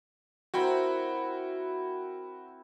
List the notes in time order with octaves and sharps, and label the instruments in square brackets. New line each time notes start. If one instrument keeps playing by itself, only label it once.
[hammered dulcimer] C4 E4 A#4 [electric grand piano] F#4 G5 B5